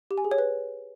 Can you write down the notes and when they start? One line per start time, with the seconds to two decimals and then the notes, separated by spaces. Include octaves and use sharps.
0.11 G4
0.18 G#5
0.24 G#4
0.31 C#5
0.38 B4